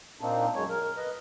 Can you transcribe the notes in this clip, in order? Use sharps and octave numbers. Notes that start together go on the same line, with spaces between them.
A#2 A#3 C4 D4 D#4
F#2 G#3 C#5
A#4
B4 D#5